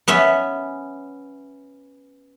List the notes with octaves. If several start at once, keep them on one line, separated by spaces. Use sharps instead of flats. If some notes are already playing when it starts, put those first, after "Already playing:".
B3 C#4 E5